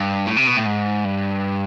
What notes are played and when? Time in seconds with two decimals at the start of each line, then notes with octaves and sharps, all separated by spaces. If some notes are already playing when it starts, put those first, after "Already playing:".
Already playing: G2
0.27 A2
0.37 C3
0.47 B2
0.57 A2
0.66 G#2
1.05 G2